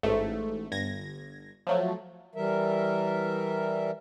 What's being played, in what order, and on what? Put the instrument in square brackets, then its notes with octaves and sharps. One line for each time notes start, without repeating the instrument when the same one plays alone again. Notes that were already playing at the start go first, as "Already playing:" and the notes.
[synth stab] A1 G#2 A3
G1 G#6 A#6
F3 F#3 A3
[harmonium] E3 G3 A#4 E5